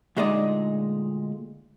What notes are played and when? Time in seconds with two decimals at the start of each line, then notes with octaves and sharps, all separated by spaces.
0.17 D2 A#2 G#3 D#4 D5 D#5